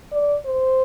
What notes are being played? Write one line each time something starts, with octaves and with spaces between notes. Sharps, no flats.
D5
C5